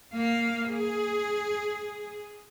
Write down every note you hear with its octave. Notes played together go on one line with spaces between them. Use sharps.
A#3 F5
G#4